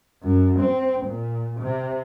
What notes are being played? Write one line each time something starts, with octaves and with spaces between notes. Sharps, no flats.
F#2
C4
A#2
C3